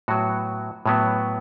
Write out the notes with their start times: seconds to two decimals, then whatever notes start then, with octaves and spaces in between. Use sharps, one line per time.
0.08 A2 F#3 B3 F#4
0.86 A2 F#3 B3